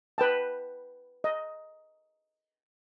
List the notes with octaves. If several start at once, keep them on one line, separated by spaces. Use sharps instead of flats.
B4 G5 A5
D#5